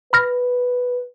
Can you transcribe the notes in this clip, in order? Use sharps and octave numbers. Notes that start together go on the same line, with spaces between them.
B4 B5 F6 A#6